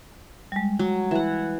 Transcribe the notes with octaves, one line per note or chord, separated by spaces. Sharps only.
G3 G#3
F#3
E3 E5 F#5